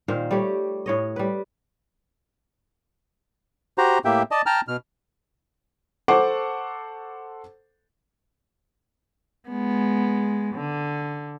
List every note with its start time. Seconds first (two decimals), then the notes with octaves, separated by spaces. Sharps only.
0.08 A#2 D#3 C5 F5
0.31 G3 A3 G4 C#5
0.86 A2 C#5 D#5
1.16 G3 B4
3.78 F#4 G4 C5 A#5
4.05 A2 A#3 G4 E5 G5
4.31 D5 D#5 A5
4.46 G5 A5 A#5 F6
4.68 B2 F6
6.08 A4 C5 F#5 C#6 D6
9.49 G#3 B3
10.55 D3